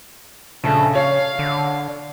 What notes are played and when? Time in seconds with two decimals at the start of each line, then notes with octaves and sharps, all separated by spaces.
0.64 A#1 C#3 A3
0.95 C#5 F5
1.39 D3